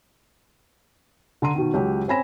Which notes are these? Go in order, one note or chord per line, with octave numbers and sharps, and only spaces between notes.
D3 A#5 C6 D#7
B2 D#3
C#2 F#3 G4
C4 C#4 G#5 B5 A#6 E7